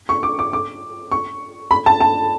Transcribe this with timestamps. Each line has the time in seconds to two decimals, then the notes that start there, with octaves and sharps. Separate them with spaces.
0.09 C#6
0.23 D6
0.39 D6
0.53 D6
1.12 C#6
1.71 B5
1.86 A5
2.00 A5